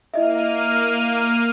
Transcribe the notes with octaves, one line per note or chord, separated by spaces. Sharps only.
A#3 E4 D#5 E5 F6 D#7